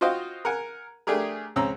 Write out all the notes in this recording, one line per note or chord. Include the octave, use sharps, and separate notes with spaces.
F4 F#4 C5 D#5 F5 G5
A#4 F#5 G#5
A3 D4 G4 G#4 A#4
C#2 C4 C#4 A#5 E6